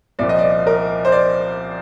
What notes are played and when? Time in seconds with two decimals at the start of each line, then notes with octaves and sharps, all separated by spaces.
0.19 C2 A#2 F3 D5
0.29 D#5
0.39 D5
0.67 A#4
1.05 C5
1.12 D5